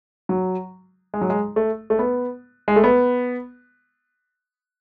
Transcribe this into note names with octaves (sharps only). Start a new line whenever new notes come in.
F#3
G#3
F#3
G#3
A3
A3
B3
G#3
A3
B3